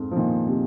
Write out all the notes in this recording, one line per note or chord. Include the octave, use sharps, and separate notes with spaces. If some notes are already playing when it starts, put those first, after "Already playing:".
Already playing: F2 G#2
F3
A#2 D#3
C3